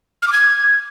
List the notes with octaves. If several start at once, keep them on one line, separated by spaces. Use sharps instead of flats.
F6
D6
G#6